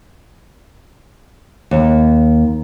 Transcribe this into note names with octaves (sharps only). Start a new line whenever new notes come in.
D#2